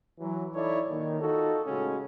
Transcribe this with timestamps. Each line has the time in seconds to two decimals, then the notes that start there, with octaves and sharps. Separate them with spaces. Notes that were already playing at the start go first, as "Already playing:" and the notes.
0.19 E3 F#3
0.54 D#4 E4 A4 C#5 D5
0.88 A#2 D#3
1.21 D#4 F4 F#4 A4
1.66 A2 C#3 G#3 C#4 F#4